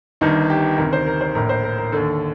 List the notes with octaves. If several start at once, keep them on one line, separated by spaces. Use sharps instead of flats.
G1 G2 D#3 D#4
G4
D2 C3 D#3 A#4
C5
A#4
C5
A#1 A2 A#4
C5
A#4
A#4
D#2 D3 A4